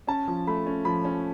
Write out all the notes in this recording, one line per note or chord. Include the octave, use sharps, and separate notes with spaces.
C#4 A5
F3
A3 B5
C#4
F3 B5
C#4